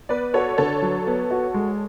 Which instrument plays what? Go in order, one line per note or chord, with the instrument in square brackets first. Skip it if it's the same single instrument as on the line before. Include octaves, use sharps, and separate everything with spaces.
[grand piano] B3 [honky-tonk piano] B4 D5
[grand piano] F#4 [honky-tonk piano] A4 C#5
[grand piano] D3 [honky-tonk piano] A4 C#5
[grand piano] F#3
B3
F#4
G#3